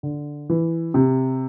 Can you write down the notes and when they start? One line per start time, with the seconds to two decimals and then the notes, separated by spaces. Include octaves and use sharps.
0.03 D3
0.49 E3
0.94 C3